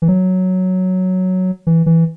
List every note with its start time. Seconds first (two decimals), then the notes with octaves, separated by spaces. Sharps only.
0.02 E3
0.08 F#3
1.67 E3
1.86 E3